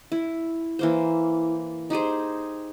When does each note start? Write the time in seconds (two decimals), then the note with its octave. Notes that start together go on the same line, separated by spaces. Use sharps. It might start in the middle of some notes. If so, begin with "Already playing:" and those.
0.12 E4
0.79 E3 A#3 C5
1.90 D#4 G4 G#4 C5